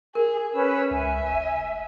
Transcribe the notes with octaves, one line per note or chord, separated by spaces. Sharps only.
G#4 A#4
C#4 B4 E6
C#2 E5 G#5
F1